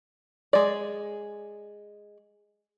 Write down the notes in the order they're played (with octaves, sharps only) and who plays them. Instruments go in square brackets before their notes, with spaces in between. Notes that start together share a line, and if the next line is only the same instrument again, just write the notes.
[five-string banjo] G#3 D5